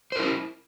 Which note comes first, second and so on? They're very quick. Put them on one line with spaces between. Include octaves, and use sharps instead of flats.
C5 A#4 E4